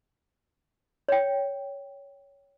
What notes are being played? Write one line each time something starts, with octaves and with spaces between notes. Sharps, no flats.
C#5 G5